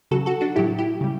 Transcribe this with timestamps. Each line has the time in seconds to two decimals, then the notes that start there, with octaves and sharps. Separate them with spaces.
0.11 C#3 F#3 F#4 A4
0.26 F#4 A4
0.41 D4 F#4
0.56 A2 F#3 E4 G4
0.78 E4 G4
1.01 C#3 G3